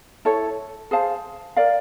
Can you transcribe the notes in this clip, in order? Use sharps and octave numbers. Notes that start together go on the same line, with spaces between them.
E4 A4 C#5
G#4 C5 F5 A5
A#4 D5 F5